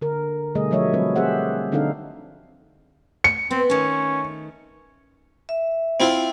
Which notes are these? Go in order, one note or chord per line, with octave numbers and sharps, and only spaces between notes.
D3 A#4
B2 D3 G3 A3 G#4 D#5
F3 F#3 A3 C#5 D#5 E5
F#3 G3 C4 A4 B4
C4 G4 G#4 C5 E5 F#5
D3 C4 D4 D#4 A4 F5
C#7
B3 C4
D#3 A3 C#4
E5
C4 E4 F4